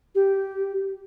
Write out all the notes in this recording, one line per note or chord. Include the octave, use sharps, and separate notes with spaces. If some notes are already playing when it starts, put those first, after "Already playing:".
G4